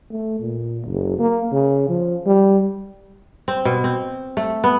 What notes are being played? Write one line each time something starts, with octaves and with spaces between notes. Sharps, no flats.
A3
A#2
F#1
A#3
C#3
F3
G3
C4
B2
C4
A3
B3